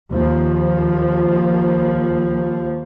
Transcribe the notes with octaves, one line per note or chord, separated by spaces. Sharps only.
D#2 F3